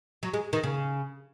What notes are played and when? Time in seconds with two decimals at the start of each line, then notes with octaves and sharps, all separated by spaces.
0.23 F#3
0.34 G#3
0.53 D#3
0.64 C#3